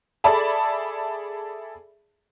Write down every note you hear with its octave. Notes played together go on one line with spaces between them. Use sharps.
G#4 A4 D5 E5 A5 B5